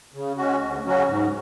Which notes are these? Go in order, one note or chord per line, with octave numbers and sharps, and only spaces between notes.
C#3
G#3 C#4 F#4
D2
C#3 F#3 C#4 F#4
G#2